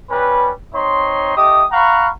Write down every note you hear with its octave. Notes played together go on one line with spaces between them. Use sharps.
G3 C#4 B4
C4 D#4 C#5 C6
A3 G4 D#5 D#6
F5 F#5 A#5 B5 C#6